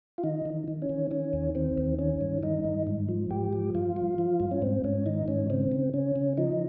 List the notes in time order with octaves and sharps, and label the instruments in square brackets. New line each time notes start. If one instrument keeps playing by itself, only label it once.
[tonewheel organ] F4
D#3 D#4
D#3
D#3
C#4
D#3
D#3 C#4
D#2
D#3 C4
D#2
D#3 C#4
G2
D#3 D#4
G2
G#2
F3
G#2 G4
F3
G2 F4
F3
F3
G2
C#4
G#2 C4
G#2 C#4
D#3 D#4
G#2 C#4
C#3 C4
C#3
C#3 C#4
C#3
F3 D#4